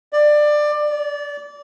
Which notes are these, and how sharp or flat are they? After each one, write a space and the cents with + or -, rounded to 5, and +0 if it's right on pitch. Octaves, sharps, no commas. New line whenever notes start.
D5 +20
D5 -25